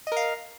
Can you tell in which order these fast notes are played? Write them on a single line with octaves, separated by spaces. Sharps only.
D#5 A#4 F5